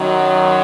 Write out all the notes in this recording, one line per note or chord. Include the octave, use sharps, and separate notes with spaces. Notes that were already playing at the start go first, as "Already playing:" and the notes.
Already playing: F#2 D#3 F#3